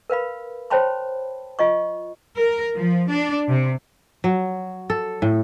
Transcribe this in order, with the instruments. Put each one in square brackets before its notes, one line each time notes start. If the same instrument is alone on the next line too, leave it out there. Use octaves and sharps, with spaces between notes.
[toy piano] A#4 B4 F5 B5
C5 C#5 G5 A5 B5 C6
F4 D#5 C#6
[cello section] A#4
F3
D4
C3
[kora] F#3
A4
A2